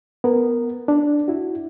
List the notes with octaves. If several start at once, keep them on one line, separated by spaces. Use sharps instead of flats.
B3 A#4
D4
E4 F#4